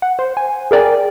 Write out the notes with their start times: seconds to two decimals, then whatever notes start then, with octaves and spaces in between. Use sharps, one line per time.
0.02 F#5
0.19 C5
0.37 G#5
0.71 G#4 A#4 D5 G5 G#5